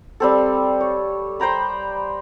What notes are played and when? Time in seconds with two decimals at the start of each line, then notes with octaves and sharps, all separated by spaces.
0.20 G3 C4 A4
0.81 C#5
1.40 C5 G5 A#5 B5